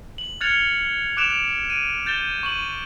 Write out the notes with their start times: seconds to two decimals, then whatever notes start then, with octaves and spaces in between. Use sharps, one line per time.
0.18 F#7
0.41 F6 F#6 G#6 A6 C#7 F7
1.17 D6 F#6 D7 E7 F7
1.70 D7 D#7
2.06 G6 A6 E7 G7
2.43 C#6 D#7 F#7